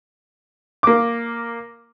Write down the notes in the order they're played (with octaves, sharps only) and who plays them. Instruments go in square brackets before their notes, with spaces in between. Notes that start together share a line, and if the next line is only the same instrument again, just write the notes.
[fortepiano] A#3 D6